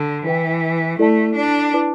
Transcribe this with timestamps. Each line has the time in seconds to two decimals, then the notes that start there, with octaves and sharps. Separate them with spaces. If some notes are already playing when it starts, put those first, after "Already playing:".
Already playing: D3
0.24 E3 E4 B4 G5
0.99 A3 E4 A4 D5 A5
1.36 D4
1.73 E4 B4 D5 A5 D6